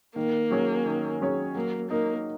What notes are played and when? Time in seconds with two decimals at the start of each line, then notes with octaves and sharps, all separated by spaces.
0.16 D#3 A#3
0.51 F#3 C#4 G#4 C#5
0.85 D#3
1.21 F#3 C#4 G#4 C#5
1.55 F#3 A#3
1.90 A#3 D#4 A#4